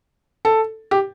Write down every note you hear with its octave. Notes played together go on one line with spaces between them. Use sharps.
A4
G4